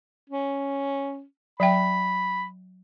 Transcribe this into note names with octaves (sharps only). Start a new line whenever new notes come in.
C#4
F#3 E5 G5 B5